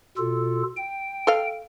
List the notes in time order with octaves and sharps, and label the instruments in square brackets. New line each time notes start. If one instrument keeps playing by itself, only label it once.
[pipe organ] B2 F4 A4
G5
[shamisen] A4 D#5 F5